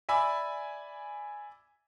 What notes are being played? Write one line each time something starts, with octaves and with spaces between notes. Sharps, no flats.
D5 E5 G#5 B5 E6